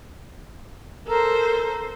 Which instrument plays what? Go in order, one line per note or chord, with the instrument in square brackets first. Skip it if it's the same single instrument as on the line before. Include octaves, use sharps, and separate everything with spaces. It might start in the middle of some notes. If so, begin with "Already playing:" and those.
[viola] A4 C5 [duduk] A#4